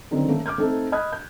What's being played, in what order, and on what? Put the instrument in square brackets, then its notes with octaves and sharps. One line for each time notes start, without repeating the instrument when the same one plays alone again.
[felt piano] D3 D#3 F#3 C4 C#4
A3 A#3 C#4
D6 F6 G6 G#6
A3 C4 D#4 A4
D#5 B5 D#6 F6 F#6 G#6
G6